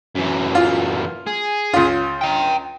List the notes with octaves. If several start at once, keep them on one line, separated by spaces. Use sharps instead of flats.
F#2 E3
F4
G#4
C#2 F4
G5 A#5